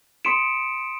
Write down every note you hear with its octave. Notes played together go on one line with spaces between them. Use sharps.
C6 D#6 B6 C#7 D7 E7